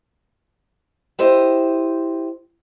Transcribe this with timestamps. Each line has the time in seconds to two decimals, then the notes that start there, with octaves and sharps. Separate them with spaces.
1.19 E4 G4 C5 D#5